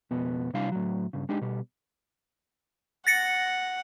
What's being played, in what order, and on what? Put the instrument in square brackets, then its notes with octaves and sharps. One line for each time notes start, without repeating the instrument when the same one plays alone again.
[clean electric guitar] F2 B2 B3
C3 G3 D4 E4 F5
A2 F#3
G2 C#3
G#3 D4 D#4 G4
B2 G3
[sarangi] F#5 [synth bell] A6 A#6 C#7